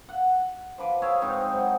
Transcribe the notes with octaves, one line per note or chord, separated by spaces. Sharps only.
F#5
F3 B4 D6
G#4 C#5 E5 F5
G#2 C4 D#4
F#3